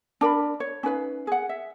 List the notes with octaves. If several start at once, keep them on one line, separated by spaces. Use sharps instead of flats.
D4 A#4 B5
C#5
C#4 D#4 B4 F5
G#4 F#5
E5